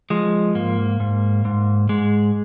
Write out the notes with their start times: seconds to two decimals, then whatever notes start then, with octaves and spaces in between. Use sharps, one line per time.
0.10 F3 G#3
0.55 G#2 A#3
1.00 G#2
1.45 G#2
1.89 G#2 G#3